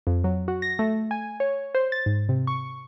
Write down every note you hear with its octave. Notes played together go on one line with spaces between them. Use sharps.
F2
F#3
F#4
A#6
A3
G#5
C#5
C5
A6
G#2
C3
C#6